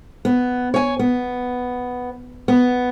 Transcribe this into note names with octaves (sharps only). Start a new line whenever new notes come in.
B3
C#5 G#5
B3
B3